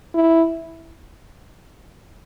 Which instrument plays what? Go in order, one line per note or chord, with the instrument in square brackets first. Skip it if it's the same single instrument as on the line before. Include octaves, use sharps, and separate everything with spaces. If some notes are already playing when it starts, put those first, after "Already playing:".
[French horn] E4